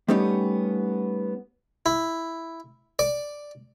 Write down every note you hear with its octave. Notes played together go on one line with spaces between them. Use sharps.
G3 A3 B3 C#4 D#4 G4
E4
D5